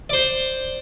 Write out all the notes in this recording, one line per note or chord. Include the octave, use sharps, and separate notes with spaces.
C5 D5